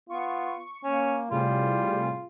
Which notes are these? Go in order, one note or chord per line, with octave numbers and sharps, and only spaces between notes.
B3 F4 C#6
A#3 C#4
A2 C3 G3 F4 G#4